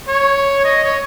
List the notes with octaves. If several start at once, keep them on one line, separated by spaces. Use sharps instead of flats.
C#5
D#5
C#5